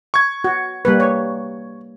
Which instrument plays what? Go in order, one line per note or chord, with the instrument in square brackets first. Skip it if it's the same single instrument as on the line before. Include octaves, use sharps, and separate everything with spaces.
[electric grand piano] C#6 G#6
[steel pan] F#4
G3 A#3 B4
C#5